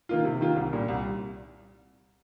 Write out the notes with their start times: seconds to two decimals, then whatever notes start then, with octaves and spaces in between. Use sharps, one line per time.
0.09 D#3 A#3 F4
0.25 C3
0.41 D#3 A#3 F4
0.56 C2
0.73 A#2 G3
0.88 C2